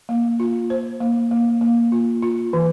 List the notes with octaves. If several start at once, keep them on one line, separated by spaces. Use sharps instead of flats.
A#3
F4
C5
A#3
A#3
A#3
F4
F4
E3